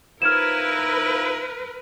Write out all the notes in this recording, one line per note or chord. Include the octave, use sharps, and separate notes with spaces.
F3 D#4 E4 A#4 B4 F6 G#6 E7